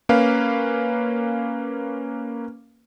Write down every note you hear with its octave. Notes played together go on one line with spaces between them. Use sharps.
A#3 C#4 B4 F5